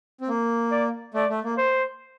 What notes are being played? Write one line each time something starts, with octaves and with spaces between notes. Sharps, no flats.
C4
A#3
D5
A3 D5
A3
A#3
C5